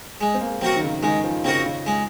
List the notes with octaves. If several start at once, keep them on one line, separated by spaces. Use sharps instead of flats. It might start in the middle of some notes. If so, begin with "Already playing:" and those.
G#3
C4
A#3
F#3 C4 F#4 A#4
D#3
C#3
D#3 G#3
F3
C#3 C4 F#4 A#4
C#3
G#3